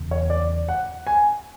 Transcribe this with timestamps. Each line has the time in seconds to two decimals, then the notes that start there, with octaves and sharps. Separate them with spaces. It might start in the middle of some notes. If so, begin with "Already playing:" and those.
Already playing: E1 E2 C#3
0.11 C#5
0.30 D5
0.68 F#5
1.07 G#5